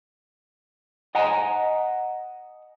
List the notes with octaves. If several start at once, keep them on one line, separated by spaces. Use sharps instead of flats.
D#5 F#5 G#5 A#5